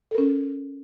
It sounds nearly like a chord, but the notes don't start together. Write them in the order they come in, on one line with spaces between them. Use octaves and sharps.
A4 A#4 C#4